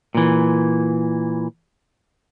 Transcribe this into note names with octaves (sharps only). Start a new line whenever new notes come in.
A#2 E3